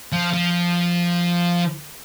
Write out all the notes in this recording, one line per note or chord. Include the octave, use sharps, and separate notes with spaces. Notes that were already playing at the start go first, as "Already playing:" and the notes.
F3
F3